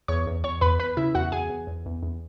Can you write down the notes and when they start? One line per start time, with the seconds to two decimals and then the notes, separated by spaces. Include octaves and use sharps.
0.08 E2 C#5 C#6
0.27 E2
0.44 E2 C#5 C#6
0.61 E2 B4 B5
0.79 E2 B4 B5
0.97 C#3 E4 E5
1.15 E2 F#4 F#5
1.32 E2 G#4 G#5
1.50 E2
1.67 E2
1.86 E2
2.03 E2